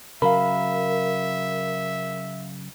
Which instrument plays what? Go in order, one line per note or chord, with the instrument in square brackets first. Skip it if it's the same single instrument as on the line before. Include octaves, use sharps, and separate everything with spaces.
[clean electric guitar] C#3 F#3 [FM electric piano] A#4 [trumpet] E5 [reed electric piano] F5 B5